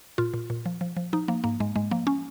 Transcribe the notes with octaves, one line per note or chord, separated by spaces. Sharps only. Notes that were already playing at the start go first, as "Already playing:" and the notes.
A#2 F4
A#2
A#2
F3
F3
F3
F3 D#4
F3 A#3
G#2 A#3
G#2 G#3
G#2 G#3
F3 A#3
C#4